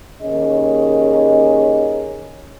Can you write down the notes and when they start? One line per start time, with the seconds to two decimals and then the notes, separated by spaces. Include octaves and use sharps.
0.21 D#2 C#4 G#4 D#5